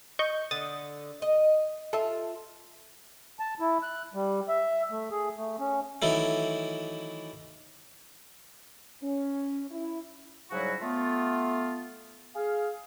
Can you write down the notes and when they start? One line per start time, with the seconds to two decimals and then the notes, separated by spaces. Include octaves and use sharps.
0.19 D#5 C#6 G6
0.51 D3 D#6 A6
1.22 D#5
1.93 F4 A4 E5 A5
3.40 A5
3.60 E4
3.83 F#6
4.14 G3
4.48 E5
4.91 A3
5.11 G#4
5.37 A3
5.60 C#4
6.02 D#3 E3 F#3 A3
9.03 C#4
9.70 E4
10.51 G#2 C#3 F#3 G3 E4 F#4
10.81 A3 B3 F4
12.35 G#4 F5